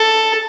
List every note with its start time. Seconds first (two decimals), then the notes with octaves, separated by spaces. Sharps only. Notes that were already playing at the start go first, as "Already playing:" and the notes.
Already playing: A4